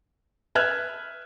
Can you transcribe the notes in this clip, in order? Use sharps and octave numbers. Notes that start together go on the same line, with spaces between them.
B4 E5 F6 F#6 G#6